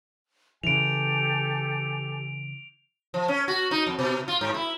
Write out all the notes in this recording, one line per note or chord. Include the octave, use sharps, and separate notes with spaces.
C#3 E3 G4 A4 G#5 D7 F7
F3
C#4
F#4
D#4
F2
B2
F4
G#2
E4